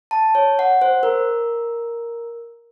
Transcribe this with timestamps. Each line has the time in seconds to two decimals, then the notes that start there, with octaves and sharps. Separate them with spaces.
0.11 A5
0.35 C#5
0.59 F#5
0.82 C5
1.03 A#4